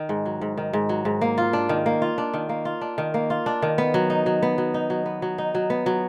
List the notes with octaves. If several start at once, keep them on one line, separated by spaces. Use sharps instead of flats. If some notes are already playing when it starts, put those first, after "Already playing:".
Already playing: D#3
G#2
F#3
G#2
D#3
G#2
F#3
G#2
A#3
F4
D4
D#3
A#3
F4
D4
D#3
A#3
F4
D4
D#3
A#3
F4
D4
D#3
B3
F#3
D#4
F#3
B3
F#3
D#4
F#3
B3
F#3
D#4
F#3
B3
F#3